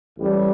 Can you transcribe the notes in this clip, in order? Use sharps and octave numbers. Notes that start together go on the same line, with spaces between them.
A1 A2 G3